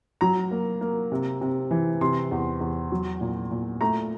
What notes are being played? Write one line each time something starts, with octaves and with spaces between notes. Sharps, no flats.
F#3 A#5
A#3
A#3
C3
C3
E3
C3 C6
E2
E2
F#3
A#2
A#2
A3 A#5